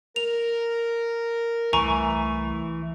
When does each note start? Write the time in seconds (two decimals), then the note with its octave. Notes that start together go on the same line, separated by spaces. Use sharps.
0.16 A#4 F7
1.73 C2 E3 A3 G#5 A#5 C#6